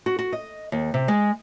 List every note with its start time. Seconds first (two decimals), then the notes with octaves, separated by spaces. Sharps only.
0.06 F#4
0.19 F#4
0.33 D#5
0.72 D#2
0.94 C3
1.08 G#3